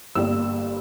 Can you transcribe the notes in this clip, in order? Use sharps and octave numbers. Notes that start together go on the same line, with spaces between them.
G1 G2 G3 A#3 E6